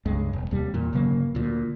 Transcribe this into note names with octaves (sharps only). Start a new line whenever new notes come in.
C#2 G2 G#3
E1
D#2 C3 G3
E2 A#2
G1 C#3 F#3 A#3
D2 A#2